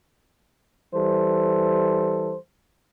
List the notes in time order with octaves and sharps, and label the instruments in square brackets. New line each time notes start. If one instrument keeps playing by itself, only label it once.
[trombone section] E3 G3 A4 C5